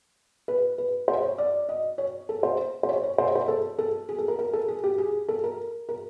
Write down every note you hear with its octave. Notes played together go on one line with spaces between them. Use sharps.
B4
B4
C5
C#5
D5
D#5
C#5
A4
C5
C5
C#5
C#5
C5
C#5
C5
A4
A4
G#4
A4
A#4
A#4
A4
G#4
G4
G#4
A4
A#4
A#4